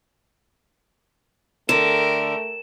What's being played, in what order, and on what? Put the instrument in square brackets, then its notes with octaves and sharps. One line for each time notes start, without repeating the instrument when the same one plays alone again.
[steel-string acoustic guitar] D3 [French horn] A3 [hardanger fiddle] A#4 G5 [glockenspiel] E7